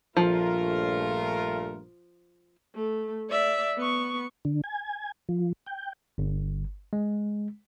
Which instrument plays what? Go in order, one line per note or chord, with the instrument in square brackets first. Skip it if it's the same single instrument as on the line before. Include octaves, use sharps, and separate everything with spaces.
[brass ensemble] A#1 G2 A#4 [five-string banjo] F3 [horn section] A3 F4
[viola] A3
D5 E5
B3 C#6
[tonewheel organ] D3
G#5
F3
G5
[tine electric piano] G1
G#3